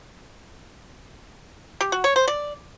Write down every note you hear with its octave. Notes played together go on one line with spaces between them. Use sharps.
G4
F#4
C#5
C5
D5